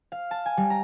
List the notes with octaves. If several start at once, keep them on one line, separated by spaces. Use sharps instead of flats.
F5
A5
G#5
G3
A#5